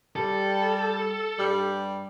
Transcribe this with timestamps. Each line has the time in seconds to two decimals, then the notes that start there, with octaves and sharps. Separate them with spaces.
0.16 G3 A4
1.38 G2 G3